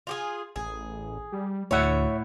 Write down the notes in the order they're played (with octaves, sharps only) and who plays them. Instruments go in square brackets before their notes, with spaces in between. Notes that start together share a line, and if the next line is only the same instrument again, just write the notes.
[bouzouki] F4 G4 G#4
[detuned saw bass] A1 [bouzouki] G#4
[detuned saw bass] G3
[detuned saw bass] D2 [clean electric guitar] A2 E4 F#5 [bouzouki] C#5 E5